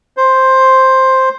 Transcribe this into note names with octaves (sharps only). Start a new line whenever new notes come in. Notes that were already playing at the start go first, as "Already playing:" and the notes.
C5